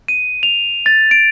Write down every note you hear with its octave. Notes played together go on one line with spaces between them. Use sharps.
D#7
F7
A6
D7